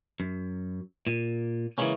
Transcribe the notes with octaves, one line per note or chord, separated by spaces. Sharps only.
F#2
A#2
C#3 E3 F#3 G#3 A#3 C#4